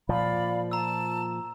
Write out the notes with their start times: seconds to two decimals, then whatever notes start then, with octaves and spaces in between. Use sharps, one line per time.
0.09 A#2 F3 D5 F5 B5
0.71 A5 A#5 E6